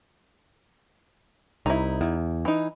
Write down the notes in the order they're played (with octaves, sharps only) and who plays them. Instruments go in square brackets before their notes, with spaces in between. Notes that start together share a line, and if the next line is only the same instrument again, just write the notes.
[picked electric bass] C2 [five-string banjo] D#4 E4
[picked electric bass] E2
[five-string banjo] E3 D#4